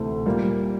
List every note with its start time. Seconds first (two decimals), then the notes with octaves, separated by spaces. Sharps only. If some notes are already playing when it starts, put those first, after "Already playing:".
Already playing: D2 C3 E3 A3
0.26 A#2 G3 A#3